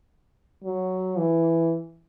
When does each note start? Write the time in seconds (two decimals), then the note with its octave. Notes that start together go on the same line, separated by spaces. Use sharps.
0.65 F#3
1.18 E3